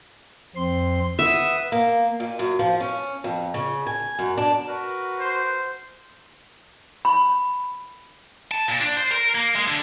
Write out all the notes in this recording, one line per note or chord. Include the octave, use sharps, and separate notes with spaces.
F2 C4 C6
B4 E5 F#5 D#6
A#3
A#2
F#2
F3
C#4
F2
C#3
G#5
F#2
D4
F#4 A#4 B4
C5
B5
A5
A#2
D4
C5
A#4
A#3
G#3
D3